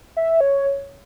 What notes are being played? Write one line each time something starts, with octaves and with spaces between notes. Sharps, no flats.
E5
C#5